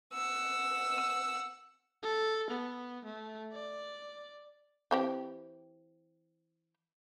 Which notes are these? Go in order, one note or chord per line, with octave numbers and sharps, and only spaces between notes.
F#5 E6
A4
B3
A3
D5
E3 C4 G4